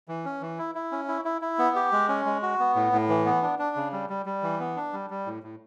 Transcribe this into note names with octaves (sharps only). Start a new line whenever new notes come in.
E3
C#4
E3
E4
E4
C#4
E4
E4
E4
B3
G4
G#3
C#4
G#3
F#4
B3
A2
A2
E3
B3
D4
D4
C#3
G3
G3
G3
E3
B3
D4
G3
G3
A2
A2